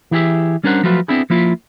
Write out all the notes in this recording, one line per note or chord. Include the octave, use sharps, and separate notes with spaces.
E3 E4 G4 G#4 E5
G3 C#4 D4 A#4 C5 F#5
F3 F#3 A3 F4 F#4 B4
B3 C4 D4 E4 G#4
F3 A#3 E4 F4